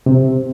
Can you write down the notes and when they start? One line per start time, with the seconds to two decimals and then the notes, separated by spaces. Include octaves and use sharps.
0.06 C3